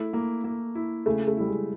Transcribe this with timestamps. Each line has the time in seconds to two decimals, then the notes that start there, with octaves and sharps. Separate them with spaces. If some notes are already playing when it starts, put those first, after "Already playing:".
Already playing: A3 E4
0.13 A#3
0.44 A#3
0.75 E4
1.06 C#3 A3
1.27 A3
1.37 G3 E4
1.47 G#3